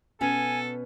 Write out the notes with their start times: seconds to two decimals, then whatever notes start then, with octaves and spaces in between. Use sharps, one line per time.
0.21 B2 B3 C#4 A4 G#5